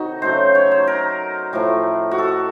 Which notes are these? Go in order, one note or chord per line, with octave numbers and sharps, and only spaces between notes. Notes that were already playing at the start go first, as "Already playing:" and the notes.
Already playing: C3 D#3 D#4 F#4 A4
C#3 F#3 A3 C5
C#5
C5
A#4
A2 F3 A3
F#4
A4